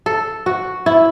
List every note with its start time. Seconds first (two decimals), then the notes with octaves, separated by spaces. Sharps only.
0.06 A4
0.46 F#4
0.86 E4